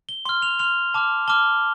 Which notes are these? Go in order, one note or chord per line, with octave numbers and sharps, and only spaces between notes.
G7
C6 F6 G7
F7
C6 F6 F7
A5 D6 F6
A5 D6 F6 G7